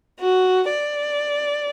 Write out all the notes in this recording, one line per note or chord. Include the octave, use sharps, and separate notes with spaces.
F#4
D5